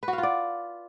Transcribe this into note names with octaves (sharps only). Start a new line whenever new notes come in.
B4
F#4
F5
F4
D5